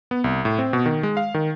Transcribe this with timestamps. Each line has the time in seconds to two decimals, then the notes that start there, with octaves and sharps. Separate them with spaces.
0.11 B3
0.24 C2
0.45 A2
0.59 C4
0.73 B2
0.86 D#3
1.03 G#3
1.17 F5
1.34 D#3